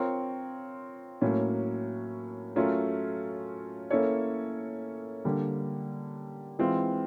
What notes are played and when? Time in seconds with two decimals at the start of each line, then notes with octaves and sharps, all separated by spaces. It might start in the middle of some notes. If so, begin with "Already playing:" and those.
Already playing: C4 F4 A#4 C#5
1.21 A2 F#3 A#3 C#4
2.56 F#3 A3 C#4 F4 A#4
3.91 A#3 C#4 E4 A4 C#5
5.25 D3 G3 A#3
6.59 E3 G#3 C4 F4